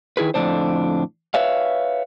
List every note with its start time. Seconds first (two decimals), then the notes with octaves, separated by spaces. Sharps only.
0.17 D#3 E4 G#4 B4
0.34 F2 A2 D3 D#3 D4 C5
1.34 B4 C#5 E5 F5